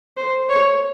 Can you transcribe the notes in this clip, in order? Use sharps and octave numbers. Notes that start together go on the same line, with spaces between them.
C5
C#5